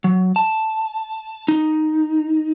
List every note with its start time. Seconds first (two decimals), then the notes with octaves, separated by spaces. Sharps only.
0.04 F#3
0.36 A5
1.48 D#4